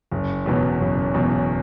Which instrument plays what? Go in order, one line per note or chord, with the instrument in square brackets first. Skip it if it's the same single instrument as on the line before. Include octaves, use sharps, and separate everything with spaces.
[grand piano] F#1
E2 B2 F#3
F#1
E2 B2 F#3